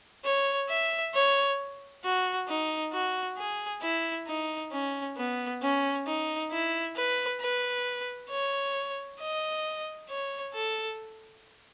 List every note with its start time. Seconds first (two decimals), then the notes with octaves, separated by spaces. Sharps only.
0.25 C#5
0.69 E5
1.14 C#5
2.04 F#4
2.48 D#4
2.93 F#4
3.37 G#4
3.82 E4
4.28 D#4
4.72 C#4
5.17 B3
5.62 C#4
6.07 D#4
6.51 E4
6.96 B4
7.41 B4
8.30 C#5
9.20 D#5
10.09 C#5
10.54 A4